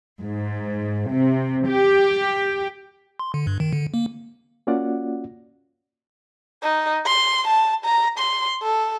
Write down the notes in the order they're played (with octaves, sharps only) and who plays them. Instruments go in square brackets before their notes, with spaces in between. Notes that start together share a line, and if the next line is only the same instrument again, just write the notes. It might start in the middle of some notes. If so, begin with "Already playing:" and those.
[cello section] G#2
C3
G4
[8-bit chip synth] C6
D3
G2
D#3
D3
A#3
[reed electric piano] A#3 C#4 F4 F#4 D5 F#5
[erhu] D#4
C6
A5
A#5
C6
A4